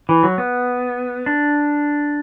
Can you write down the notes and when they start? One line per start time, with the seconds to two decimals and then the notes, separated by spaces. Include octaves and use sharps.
0.09 E3
0.23 F#3
0.38 B3
1.26 D4